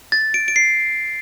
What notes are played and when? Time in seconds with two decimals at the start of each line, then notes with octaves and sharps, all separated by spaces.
0.12 A6
0.34 D7
0.48 D7
0.56 C7